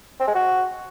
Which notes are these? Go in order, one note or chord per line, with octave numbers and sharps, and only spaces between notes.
C4
G#3
F#4